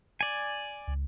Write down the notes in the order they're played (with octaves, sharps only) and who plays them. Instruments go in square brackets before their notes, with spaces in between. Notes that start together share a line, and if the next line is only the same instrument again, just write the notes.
[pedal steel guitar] D5 G#5
[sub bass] C#2